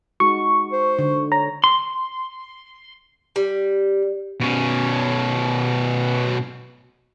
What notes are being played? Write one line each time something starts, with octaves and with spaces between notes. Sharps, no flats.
G#3 D#4 F#4 C#6
C5
D3
C#5 A#5
C6
G3
B2 C#4